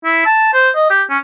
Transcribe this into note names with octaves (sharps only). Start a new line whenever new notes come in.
E4
A5
C5
D#5
G4
C#4